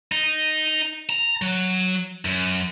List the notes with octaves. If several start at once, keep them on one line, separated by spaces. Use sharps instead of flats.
D#4
A#5
F#3
F#2